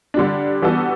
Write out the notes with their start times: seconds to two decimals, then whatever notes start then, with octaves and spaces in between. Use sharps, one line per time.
0.14 D3 G3 D4
0.62 E3 G3 B3 F#4 A4